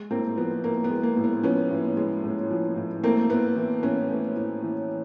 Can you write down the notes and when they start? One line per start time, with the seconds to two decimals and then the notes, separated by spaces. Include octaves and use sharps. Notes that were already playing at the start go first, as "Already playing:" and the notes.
Already playing: G#3
0.11 A2 A#3 C4
0.37 F3 B3
0.64 A2 A#3
0.84 B3
0.90 G#3
1.03 A#3
1.17 A2
1.24 B3
1.43 F3 B3 C#4
1.70 A2
1.97 G#3
2.24 A2
2.50 F3
2.76 A2
3.03 A3 A#3 C4
3.30 A2 B3
3.56 E3
3.83 A2 B3 C#4
4.09 A3
4.36 A2
4.63 E3